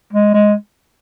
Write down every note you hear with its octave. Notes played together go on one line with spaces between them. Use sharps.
G#3
G#3